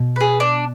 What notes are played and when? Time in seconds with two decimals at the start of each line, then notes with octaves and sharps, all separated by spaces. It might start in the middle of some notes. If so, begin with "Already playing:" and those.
Already playing: B2
0.16 G#4 B4
0.40 D4